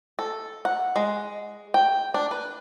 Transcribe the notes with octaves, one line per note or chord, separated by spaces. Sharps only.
A4
F#5
G#3
G5
D4
B4